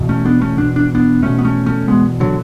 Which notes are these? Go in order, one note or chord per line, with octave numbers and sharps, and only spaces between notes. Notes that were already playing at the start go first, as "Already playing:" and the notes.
Already playing: E2 B2
A3 C#4
B3 D4
A3 C#4
E2 B2 D4
D4
B3 D4
E2 B2 A3 C#4
B3
A3 C#4
A3 C#4
E2 B2 G#3 B3
D3 F#3